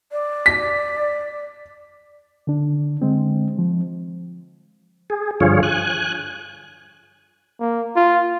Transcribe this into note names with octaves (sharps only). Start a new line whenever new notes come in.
D5
B6
D3 D4
D3 G#3 C4
F3
G#4
G2 D3 F3 F4 G#4 C#5
G#5 F#6
A#3
F4